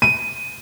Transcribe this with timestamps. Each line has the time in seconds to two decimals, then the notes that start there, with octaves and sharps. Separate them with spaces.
0.02 D#7